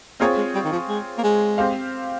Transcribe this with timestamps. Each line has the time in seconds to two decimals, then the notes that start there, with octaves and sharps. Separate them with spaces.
0.20 A#3 C4 F4 G#4 C#5
0.37 G#3
0.54 G3
0.65 D#3
0.72 F3
0.89 G#3
1.18 A#3
1.23 G#3
1.58 C4 G4 C5 F5